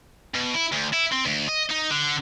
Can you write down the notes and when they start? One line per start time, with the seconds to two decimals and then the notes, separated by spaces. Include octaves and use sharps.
0.34 B2
0.54 E4
0.72 D2
0.93 E4
1.12 C4
1.26 D2
1.49 D#5
1.71 D#4
1.91 D3